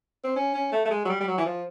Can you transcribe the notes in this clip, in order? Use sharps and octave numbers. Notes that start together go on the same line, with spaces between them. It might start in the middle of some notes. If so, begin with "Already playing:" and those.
C4
C#4
C#4
A3
A3
G#3
F#3
G3
G3
F#3
E3
F3